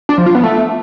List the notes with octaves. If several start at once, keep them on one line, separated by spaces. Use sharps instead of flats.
D4
F3
F4
B3
A3